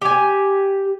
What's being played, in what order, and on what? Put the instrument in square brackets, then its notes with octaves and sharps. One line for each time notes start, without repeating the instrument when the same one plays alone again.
[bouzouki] G4 G#5